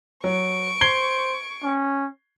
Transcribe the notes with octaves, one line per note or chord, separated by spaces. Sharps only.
F#3 C#6 D7
C5 G#6 C7 G7
C#4